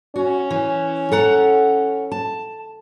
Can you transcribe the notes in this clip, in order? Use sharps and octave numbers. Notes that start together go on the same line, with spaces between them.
C#4 F#4
E3
A4 F#5 A#5
A5